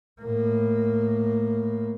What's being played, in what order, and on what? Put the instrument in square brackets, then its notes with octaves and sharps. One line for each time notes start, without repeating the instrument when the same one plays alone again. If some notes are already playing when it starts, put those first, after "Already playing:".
[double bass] A2 A#3